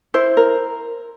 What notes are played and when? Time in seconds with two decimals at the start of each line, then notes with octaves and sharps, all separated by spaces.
0.14 E4 C5
0.37 A#4